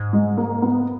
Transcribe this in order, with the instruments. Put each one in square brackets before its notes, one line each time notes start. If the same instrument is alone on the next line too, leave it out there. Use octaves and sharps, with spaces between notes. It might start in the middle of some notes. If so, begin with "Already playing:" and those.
Already playing: [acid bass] G#2
[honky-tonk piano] G#3
A#3
B3